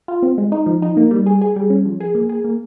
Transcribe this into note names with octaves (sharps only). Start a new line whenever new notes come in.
F4
C4
G#3
D#4
F3
D#4
A#3
G3
G#4
G#4
G3
C#4
F3
G#4
A#3
G#4
A#3